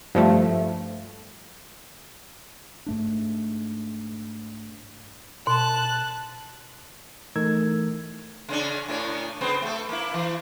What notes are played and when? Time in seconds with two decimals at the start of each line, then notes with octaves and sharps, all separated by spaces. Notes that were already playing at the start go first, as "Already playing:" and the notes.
0.15 G2 F3 A3
2.86 G#2 A3 D4
5.47 B2 A5 F#6
7.36 E3 A3 D#4 A#4 E6 G#6
8.49 C#3 C#4 D4
8.88 A2 D4 C#5
9.41 C#3 B3 C4
9.62 A3 A4
9.89 A#3 E4
10.14 E3